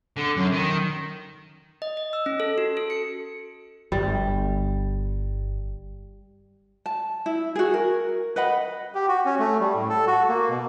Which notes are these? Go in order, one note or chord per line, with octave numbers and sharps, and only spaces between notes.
D3
F#2
D#3
D#5
D#5
E6
C#4
A4
F#4
A4
C#7
G1 G3
A5
E4
F#4 G#4
A#4
B4 D#5 F#5 B5
G4
F#4
C#4
A3
G3
A2
A4
F#4
A#3
B2